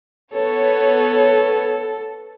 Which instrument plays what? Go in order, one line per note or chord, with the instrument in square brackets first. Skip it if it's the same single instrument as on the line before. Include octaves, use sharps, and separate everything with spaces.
[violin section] B3 C#5 [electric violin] A4